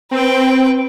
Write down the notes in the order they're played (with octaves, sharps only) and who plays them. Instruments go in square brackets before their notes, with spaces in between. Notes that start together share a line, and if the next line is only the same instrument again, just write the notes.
[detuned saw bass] C4 [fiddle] B4 G5